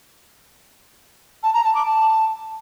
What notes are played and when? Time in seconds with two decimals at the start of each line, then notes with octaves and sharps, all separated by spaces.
1.43 A5
1.53 A#5
1.64 A5
1.74 D6
1.85 A5